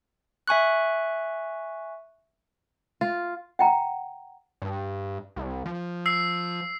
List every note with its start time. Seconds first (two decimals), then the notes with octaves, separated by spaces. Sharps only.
0.48 E5 G#5 C#6 F#6
3.01 F4
3.59 F#5 G5 A#5
4.62 G2
5.36 C2
5.66 F3
6.06 E6 C7